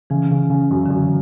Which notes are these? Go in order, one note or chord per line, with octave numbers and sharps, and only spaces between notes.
C#3 E3
C#3
C#3
F#2
D3
F#2 E3